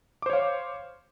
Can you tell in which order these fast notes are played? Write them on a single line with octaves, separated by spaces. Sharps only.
D6 C5 C#5 F5